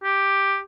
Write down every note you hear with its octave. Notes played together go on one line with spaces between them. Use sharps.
G4